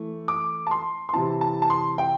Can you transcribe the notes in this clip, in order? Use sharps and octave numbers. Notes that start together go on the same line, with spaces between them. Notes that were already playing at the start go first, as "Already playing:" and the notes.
Already playing: E3 A3
D6
A5
C6
C6
C3 E3 C4 E4 A5
A5
A5
C6
G5